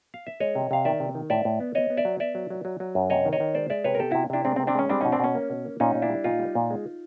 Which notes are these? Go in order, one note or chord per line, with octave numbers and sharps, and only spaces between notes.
F5
E5
G#3 C#5 D#5
C3
C3 F5
D#3 D5 E5
C3
D#3
A2 D5 E5
A2
B3
B3 C#5 D#5
B3
D5 E5
F#3
B3 D5 E5
F#3
F#3
F#3
F#3
F#2
C3 C#5 D#5
D#3
C#5 D#5
D#3
G#3 C5 D5
G#3 D5 E5
C3 B4 C#5
A#4
B3 G4 A4
C3 E4 F#4
C3 D4 E4
G#3 C4 D4
C4
C3
C4 D4
G#3 C#4
G3 C4 D4
B2 C#4 D#4
C4 D4
B2 C#4
A#3
B2
A#3
A#2 C#4 D#4
A#2
D4 E4
G3
A#2 D#4 F4
G3
A#2
G#3